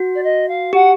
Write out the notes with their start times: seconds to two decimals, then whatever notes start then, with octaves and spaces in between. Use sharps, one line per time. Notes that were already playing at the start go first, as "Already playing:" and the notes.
Already playing: F#4
0.15 D5
0.23 D#5
0.48 F5
0.73 G4 F#5